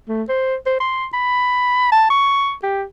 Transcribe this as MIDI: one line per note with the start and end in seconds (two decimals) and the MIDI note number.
0.09 0.23 57
0.29 0.55 72
0.66 0.76 72
0.80 1.06 84
1.14 1.91 83
1.92 2.07 81
2.10 2.53 85
2.63 2.84 67